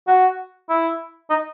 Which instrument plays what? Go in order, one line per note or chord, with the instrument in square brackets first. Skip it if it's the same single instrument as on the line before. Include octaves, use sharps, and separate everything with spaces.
[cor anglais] F#4
E4
D#4